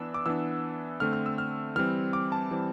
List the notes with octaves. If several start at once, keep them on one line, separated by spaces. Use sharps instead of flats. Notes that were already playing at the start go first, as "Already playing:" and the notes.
Already playing: E3 B3 D4 E6
D6
E3 B3 D4 E6
D3 A3 C4 F6
F6
E6
F6
E3 G3 C4 F6
D6
A5
E3 G3 C4